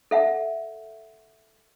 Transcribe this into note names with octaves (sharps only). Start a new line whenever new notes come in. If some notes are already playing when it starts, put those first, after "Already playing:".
A4 E5 F#5